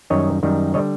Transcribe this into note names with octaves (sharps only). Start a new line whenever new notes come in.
F#2 D#3 G3 C#5 D#5
F#2 D#3 G3
D3 G3 C#5 D#5